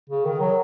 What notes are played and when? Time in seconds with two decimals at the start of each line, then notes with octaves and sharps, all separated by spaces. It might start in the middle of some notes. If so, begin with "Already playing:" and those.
0.10 C#3
0.25 D#3
0.41 F#3